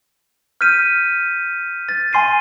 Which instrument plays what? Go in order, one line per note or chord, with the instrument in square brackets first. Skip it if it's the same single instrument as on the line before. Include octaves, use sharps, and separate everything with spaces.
[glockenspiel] F6 G6 B6 D#7
A6
G#5 C6 C7 D#7